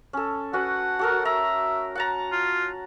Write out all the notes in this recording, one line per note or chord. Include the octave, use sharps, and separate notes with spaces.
C#4 A4
C#4 F#4 B4 F#5
F#4 A4 A#4
E5 A#5
F#5 A5 A#5
F4